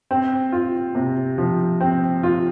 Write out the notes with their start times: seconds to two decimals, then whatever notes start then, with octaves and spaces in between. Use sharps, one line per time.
0.11 C4
0.52 F4
0.95 C3
1.38 F3
1.80 C4
2.23 F4